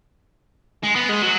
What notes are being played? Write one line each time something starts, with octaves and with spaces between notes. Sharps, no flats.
G#3
B3
G#3
F#3